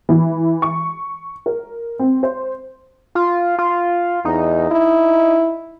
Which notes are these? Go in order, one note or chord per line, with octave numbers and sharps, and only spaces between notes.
E3
C#6
A#4
C4
C5
F4
F4
E2 D#4
E4